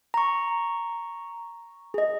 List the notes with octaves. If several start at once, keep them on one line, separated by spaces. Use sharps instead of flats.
A#5 C#6
G#4 D#5